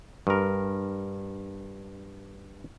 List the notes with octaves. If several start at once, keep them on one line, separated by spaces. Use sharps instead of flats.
G2 A#4